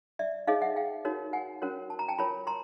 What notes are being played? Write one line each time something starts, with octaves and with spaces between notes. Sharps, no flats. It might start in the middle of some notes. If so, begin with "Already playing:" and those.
D5 E5
D#4 G#4 C#5 D#5 F5
E5 F#5
F5 G5
D#4 F#4 A#4 C#5
F#5 G#5
C#4 F#4 A#4 C#5
A5
A#5
G5 A5
F4 A#4 C#5 A5 B5
A#5 C6